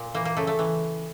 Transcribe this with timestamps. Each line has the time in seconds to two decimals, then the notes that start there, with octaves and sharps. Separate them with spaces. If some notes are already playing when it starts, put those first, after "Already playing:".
Already playing: A#2
0.14 E3 A#3
0.25 A#3
0.37 C#3 A3
0.47 A3
0.59 E3